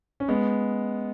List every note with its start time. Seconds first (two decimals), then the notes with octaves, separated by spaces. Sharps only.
0.20 C#4
0.28 G#3 B3